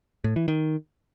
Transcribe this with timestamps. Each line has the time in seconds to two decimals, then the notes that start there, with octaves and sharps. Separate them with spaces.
0.24 A2
0.36 E3
0.48 D#3